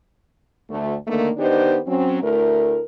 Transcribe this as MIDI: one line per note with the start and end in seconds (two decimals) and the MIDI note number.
0.70 0.94 38
0.70 0.94 57
1.08 1.29 50
1.08 1.29 51
1.08 1.29 57
1.08 1.29 58
1.37 1.79 51
1.37 1.79 59
1.37 1.79 62
1.37 1.79 63
1.37 1.79 67
1.37 1.79 72
1.86 2.22 54
1.86 2.22 60
1.86 2.22 61
2.22 2.82 38
2.22 2.82 57
2.22 2.82 64
2.22 2.82 70